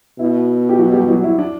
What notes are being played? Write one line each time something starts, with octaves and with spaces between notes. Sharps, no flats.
B2 E4
G4
F#3 F#4
G3 G4
F#3 F#4
E4
D4